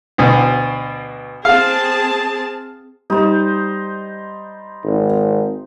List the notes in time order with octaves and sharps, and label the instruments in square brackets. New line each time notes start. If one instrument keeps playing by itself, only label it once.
[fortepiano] D2 B2
[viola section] C4 G#4 A5 [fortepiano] F5
[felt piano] G3 [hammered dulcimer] D#4 C5
[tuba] G#1